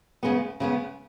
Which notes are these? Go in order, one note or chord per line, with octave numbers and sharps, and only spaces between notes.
C#3 G#3 B3
C#3 G#3 B3